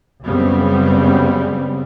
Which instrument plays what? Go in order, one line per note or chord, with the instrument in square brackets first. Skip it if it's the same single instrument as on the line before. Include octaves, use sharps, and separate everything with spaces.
[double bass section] F#2 C#3 G3 B3 C4